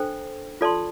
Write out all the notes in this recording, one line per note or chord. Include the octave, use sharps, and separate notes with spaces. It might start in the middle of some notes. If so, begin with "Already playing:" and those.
Already playing: D4 A4 C5 G5
F4 A4 D5 A5 C6